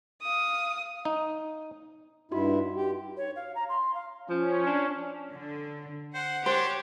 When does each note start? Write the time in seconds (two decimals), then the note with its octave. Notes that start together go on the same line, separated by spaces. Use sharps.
0.22 F5 D#6
1.05 D#4
2.31 G2 D#4 E4 F#4 C6
2.76 G4
3.17 C#5
3.36 F5
3.55 A#5
3.69 C6
3.94 F5
4.30 F3 C#4
4.66 D4
5.34 D3
6.14 C5 F#5
6.46 D4 G4 C5 C#5